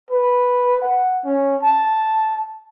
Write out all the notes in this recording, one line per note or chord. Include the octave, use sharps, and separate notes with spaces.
B4
F#5
C#4
A5